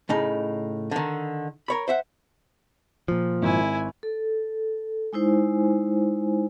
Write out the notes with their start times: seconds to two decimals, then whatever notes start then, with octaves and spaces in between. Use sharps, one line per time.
0.09 A2 C#3 D#4
0.91 D3 D#3
1.68 A#4 C#5 B5
1.88 C5 E5 F#5
3.08 A#2 F3
3.42 G#1 E4 G#5
4.03 A4
5.13 G#3 D#4 E4 C5 G#5